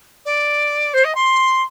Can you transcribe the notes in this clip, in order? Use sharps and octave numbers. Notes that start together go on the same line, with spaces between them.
D5
C5
D#5
C6